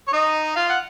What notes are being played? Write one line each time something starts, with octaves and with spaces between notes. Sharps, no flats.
C#5
D#4 D#5
F4 F5
F#5